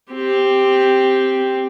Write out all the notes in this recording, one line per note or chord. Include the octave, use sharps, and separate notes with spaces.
C4 G4